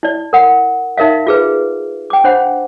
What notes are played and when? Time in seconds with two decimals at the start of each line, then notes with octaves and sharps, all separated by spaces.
0.03 E4 D5
0.33 A#4 F#5
0.97 D#4 A#4 E5 F5
1.27 F4 G#4 B4
2.10 G5 D6
2.24 D4 C5 F#5 B5